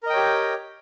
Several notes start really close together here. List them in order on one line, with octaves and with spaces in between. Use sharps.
A#4 D#5 G5 C#5 G4